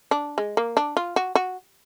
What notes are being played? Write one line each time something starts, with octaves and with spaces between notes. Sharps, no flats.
D4
G#3
A#3
D4
F4
F#4
F#4